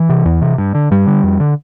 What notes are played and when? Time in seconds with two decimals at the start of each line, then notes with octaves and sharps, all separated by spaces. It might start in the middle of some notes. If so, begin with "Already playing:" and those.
Already playing: E3
0.09 C3
0.25 E2
0.42 C3
0.58 G2
0.75 D3
0.91 G2 G3
1.07 D3
1.23 F2
1.40 D3